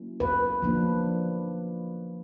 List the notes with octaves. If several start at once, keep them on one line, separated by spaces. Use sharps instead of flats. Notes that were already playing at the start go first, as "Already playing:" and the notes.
Already playing: F#3 A#3 C#4 E4
B4
F3 A#3 D4